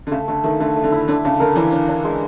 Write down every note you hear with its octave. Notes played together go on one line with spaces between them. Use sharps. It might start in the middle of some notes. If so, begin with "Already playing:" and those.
D3
C#3 A3
D3 A3
D#3 A3
D3 A3
A3
D3
E4
D3 D4
C#3 D4
D3 A#4
E3 D4
D4
D4
G#3